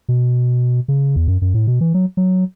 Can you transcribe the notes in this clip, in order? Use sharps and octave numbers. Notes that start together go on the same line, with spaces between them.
B2
C#3
E2
F#2
F#2
A2
B2
E3
F#3
F#3